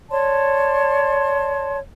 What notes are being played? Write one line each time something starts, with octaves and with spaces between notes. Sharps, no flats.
C#5 D5 A5 C6